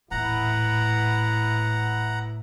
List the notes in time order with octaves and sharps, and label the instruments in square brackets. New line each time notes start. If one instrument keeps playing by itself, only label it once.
[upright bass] D#1 E3 [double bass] A2 [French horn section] B3 E4 [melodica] F#5 A#5